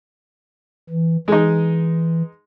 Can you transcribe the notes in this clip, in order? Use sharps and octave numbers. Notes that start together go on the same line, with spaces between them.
E3
E3 G#3 D#4